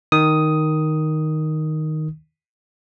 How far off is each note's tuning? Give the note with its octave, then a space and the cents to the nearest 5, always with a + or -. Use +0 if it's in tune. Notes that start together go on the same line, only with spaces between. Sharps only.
D#3 +0 D#6 +5